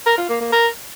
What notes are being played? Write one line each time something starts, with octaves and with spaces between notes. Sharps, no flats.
A#4
F4
A#3
A#3
A#4